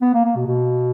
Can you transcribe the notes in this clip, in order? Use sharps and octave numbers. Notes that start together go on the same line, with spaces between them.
B3
A#3
A#3
B2
B2